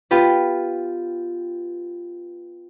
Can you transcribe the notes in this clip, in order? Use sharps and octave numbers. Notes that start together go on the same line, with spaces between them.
B3 F4 G4 B4